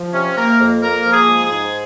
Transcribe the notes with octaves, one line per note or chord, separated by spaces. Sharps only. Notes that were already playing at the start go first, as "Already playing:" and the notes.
Already playing: F3
C3 C#4
A#3 A#4
F2
A#3 A#4
F3
G#4
G#2
G#4
G#2